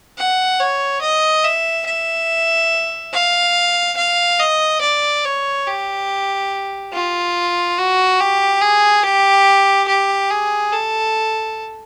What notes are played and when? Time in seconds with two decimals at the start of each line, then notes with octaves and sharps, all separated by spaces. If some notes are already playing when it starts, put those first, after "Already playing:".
0.18 F#5
0.60 C#5
1.02 D#5
1.44 E5
1.86 E5
3.14 F5
3.97 F5
4.39 D#5
4.81 D5
5.25 C#5
5.67 G4
6.93 F4
7.78 F#4
8.20 G4
8.61 G#4
9.03 G4
9.88 G4
10.30 G#4
10.73 A4